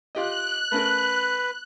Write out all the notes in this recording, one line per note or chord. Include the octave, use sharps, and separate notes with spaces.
F4 G4 D#5 F#6
A3 C#4 A#4 B4